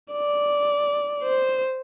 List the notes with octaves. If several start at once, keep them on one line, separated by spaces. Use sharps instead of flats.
D5
C5